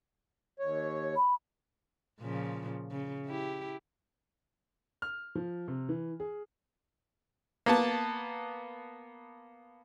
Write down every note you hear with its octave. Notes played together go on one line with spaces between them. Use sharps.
D#2 C#5
B5
A#2 C#3 F3
C#3
E4 G4
F6
F3
C3
E3
G#4
A#3 B3 A5